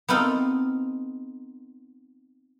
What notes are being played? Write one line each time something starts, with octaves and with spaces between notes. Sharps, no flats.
B3 C4 D#4 F4 A4